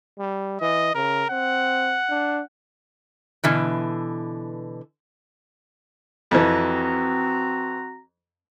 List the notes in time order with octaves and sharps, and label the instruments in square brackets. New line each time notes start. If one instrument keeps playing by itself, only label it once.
[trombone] G3
[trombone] E3 [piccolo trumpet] D#5
[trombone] C#3 [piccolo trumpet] A#4
[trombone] C4 [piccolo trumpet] F#5
[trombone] D4
[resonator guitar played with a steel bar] B2 D3 E3
[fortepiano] F2 E3 [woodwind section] C4 F#4 A#5